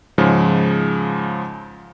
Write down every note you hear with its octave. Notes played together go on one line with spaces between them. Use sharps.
G#2 C#3 F3 G#3